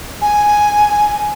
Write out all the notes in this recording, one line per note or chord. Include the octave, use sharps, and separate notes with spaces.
G#5